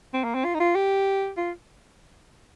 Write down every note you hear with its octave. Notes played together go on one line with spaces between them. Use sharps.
C4
A#3
C4
F4
D#4
F4
G4
F4